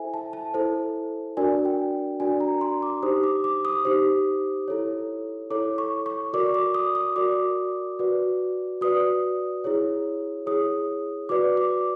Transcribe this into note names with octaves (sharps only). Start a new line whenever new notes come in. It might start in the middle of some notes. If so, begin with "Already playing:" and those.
Already playing: E4 A4 C5 E5 G#5
A5
A5
E4 A4 C5
D4 F#4 A#4 D5 G#5
G5
D4 F#4 A#4 D5 G#5
A#5
C6
D6
D#4 G4 C5 D#6
D6
D6
D#6
D#4 G4 C5
E4 A4 C#5
E4 A4 C#5 D6
C#6
C#6
F#4 A#4 D5 D6
D6
D#6
D#6
F#4 A#4 D5 D6
F#4 B4 D5
F#4 B4 D5 D#6
E4 G#4 C#5
E4 G#4 C#5 D#6
F#4 B4 D5 D6
D6